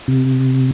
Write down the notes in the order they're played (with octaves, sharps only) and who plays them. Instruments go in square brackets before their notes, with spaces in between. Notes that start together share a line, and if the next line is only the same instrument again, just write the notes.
[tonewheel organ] C3